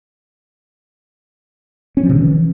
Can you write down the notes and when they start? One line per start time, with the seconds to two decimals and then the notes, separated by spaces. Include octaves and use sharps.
1.97 C#4
2.03 F3
2.09 C3
2.16 D#3
2.22 E3